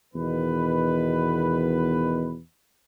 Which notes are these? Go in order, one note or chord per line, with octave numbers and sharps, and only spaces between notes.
E2 B2 D#3 B4